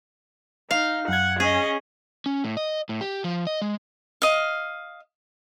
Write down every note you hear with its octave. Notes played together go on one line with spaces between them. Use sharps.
D#4 F5
F#2 F#5 G#6
C#4 G#4 D#5
C#4
A2
D#5
A2
G4
F3
D#5
G#3
D#5 F5